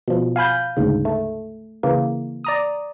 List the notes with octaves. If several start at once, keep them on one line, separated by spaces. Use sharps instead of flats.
B2 F3
F5 G#5 B5 G6
D2 G#2 C#3
A3
C#3 E3 A#3
D5 A#5 D#6